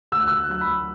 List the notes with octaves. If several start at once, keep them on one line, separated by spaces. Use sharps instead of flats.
D2 E6
F#6
D2 E6
F#6
F#3 F#6
B5
F#3